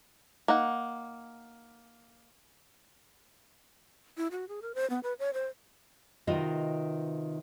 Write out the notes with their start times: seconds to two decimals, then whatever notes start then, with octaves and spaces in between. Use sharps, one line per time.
0.48 A#3 D#4 F#5
4.17 E4
4.31 F#4
4.49 G#4
4.62 A#4
4.75 C5
4.90 B3
5.03 B4
5.19 C#5
5.34 C5
6.27 C3 D#3 F4 F#4 B4 D#5